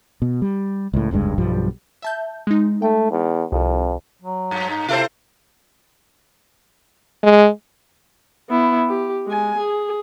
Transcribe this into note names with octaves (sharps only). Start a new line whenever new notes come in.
B2
G3
C#2 A2
F1 C#2 G2 G#3
B1 G2 F3 G3
E5 A5 G6
G#3 D#4
A3 G5
E2
C2 F2
F#3
G2
D#4
C3 E4 A4 C5
G#3
B3 E4
G4
G#3 G#5
G#4